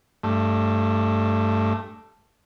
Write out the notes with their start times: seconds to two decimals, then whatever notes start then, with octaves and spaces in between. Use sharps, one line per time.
0.24 G2 A3